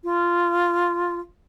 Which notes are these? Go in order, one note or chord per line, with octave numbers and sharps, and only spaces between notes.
F4